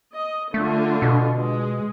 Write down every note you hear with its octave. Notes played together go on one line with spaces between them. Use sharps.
D#5
D3 A3 F4
B2
G#3